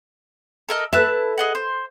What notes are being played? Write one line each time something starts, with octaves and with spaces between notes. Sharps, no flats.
A4 A#4 D#5
E4 A4 B4 E5 A5 F#6
G#4 D#5 F#5
C5